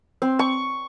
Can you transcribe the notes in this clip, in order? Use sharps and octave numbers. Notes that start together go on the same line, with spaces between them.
C4
C#6